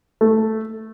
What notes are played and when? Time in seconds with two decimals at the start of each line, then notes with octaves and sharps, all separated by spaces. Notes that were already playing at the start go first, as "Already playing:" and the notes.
0.21 A3